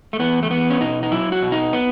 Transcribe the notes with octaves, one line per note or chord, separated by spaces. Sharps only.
A3
E2 B3
A3
E2 B3
C#4
B2 D#4
D#4
F#3 E4
F#4
B2
D#4
B3